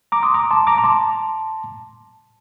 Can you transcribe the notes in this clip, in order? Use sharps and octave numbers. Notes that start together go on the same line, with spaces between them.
A#5 D6
C6 D#6
A#5 D6
A5 C6
A#5 D6
A#5
A5 C6